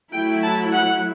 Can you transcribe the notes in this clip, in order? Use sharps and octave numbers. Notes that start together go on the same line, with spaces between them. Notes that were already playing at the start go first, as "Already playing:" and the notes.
F#3 A3 E4 G5
A5
F#5